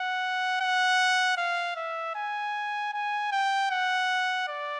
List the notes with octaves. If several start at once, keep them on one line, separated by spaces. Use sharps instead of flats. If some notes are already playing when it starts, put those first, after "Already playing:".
Already playing: F#5
F#5
F5
E5
G#5
G#5
G5
F#5
D5